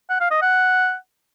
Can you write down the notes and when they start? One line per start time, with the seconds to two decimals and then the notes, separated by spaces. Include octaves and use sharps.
0.10 F#5
0.21 F5
0.31 D#5
0.42 F#5